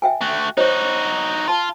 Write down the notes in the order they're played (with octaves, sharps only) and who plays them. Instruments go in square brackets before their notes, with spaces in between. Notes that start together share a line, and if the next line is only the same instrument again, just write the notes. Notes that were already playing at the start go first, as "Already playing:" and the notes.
[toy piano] E5 G5 G#5
[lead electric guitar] A3 F#4
[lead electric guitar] D#4 F#4 [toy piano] C5 C#5 D#5
[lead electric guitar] F4 [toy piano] A5 C6